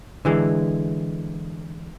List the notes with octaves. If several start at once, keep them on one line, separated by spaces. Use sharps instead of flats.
D3 E3 G#3